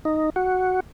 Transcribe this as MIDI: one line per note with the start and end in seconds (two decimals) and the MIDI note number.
0.05 0.30 63
0.36 0.80 66